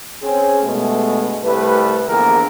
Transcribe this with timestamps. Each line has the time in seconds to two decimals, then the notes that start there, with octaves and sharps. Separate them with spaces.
0.23 C4 C#4 G#4
0.63 G2 B2 G#3 A3
1.43 C2 G3 A3 B4
2.08 A#1 E2 D3 G#4 A#4